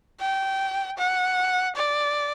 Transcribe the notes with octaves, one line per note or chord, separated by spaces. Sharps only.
G5
F#5
D5